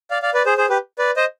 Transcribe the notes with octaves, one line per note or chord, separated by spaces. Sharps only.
D5 F5
D5 F5
B4 D5
G#4 C5
G#4 C5
G4 B4
B4 D5
C5 D#5